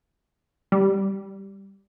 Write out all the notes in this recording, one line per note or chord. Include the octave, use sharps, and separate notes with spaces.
G3